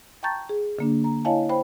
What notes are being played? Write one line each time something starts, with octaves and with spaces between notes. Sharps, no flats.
G5 A5 A#5 C#6 G6 A6
G#4
D3 A#3 D4
A#5
E4 C#5 D#5 F5 G#5 A5
C5 G5 B5